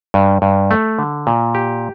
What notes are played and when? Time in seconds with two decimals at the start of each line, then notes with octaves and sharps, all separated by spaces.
0.14 G2
0.42 G2
0.71 A3
0.99 D3
1.27 A#2
1.55 G4